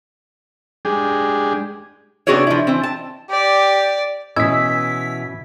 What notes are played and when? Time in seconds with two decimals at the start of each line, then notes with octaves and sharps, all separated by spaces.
0.85 G#3 D4 G4 G#4
2.27 C3 B3 D4 F#4 G#4 C#5
2.47 F3 E4
2.67 E3 C4
2.83 A5
3.30 G4 D5
4.36 B2 E3 C#4 E4 D#5 E6 G#6 B6